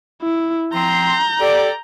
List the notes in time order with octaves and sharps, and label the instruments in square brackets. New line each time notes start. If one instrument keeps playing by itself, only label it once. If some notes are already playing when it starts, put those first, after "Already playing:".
[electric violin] E4
[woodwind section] F3 C4 C6 [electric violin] A#5 G6
[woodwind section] G4 A4 D5